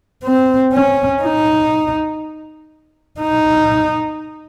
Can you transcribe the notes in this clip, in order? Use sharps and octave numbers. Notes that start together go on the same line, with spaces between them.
C4
C#4
D#4
D#4